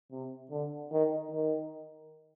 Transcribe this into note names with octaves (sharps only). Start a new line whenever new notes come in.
C3
D3
D#3
D#3